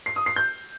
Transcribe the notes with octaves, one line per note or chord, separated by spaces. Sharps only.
C7
D#6
C7
G6